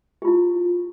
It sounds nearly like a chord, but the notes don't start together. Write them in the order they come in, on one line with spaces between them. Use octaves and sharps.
G4 F4 E4